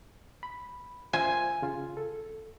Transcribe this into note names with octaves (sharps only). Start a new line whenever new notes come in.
B5
F4 C5 E5 G#5
C#3 F4
A4